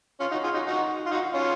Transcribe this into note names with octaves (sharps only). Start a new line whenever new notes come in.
C#4 F4
D#4 F#4
F4 G#4
D#4 F#4
D#4 F#4
F4
D#4 F#4
C#4 F4